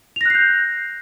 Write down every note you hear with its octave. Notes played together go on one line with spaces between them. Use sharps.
F#6 G6 A#6 C7 F7